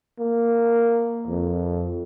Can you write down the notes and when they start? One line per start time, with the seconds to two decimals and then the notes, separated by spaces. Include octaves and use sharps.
0.19 A#3
1.27 F2